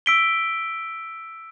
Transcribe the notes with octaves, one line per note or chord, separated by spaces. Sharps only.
E6 B6 D7 G7